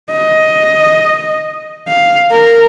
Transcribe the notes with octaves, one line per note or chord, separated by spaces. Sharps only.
D#5
F5
A#4